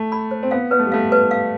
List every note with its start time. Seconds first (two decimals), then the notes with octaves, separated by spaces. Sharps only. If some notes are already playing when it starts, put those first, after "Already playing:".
Already playing: A3
0.12 B5
0.31 C5
0.43 C4
0.51 B3 F5
0.71 B3 B4
0.79 A3
0.87 G3
0.92 A3 F5
1.12 B4
1.31 F5